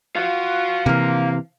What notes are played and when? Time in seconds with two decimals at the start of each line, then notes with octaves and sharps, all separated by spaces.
0.16 F4 F#4 C5 F5
0.86 C3 E3 A#3